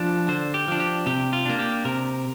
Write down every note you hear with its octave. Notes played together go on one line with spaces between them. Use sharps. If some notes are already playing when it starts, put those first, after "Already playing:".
Already playing: F3 D4
D3 C5
G4
F3 D4
G4
C3 G4
F4
A#3 D4
G4
C3 A#4